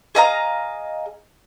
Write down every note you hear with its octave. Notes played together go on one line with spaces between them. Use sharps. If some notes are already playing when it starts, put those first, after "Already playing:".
G#4 D#5 F5 A#5